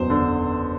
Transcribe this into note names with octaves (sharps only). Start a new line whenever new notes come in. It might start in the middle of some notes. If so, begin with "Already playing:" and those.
Already playing: F#1 E2 F#3 C5
D3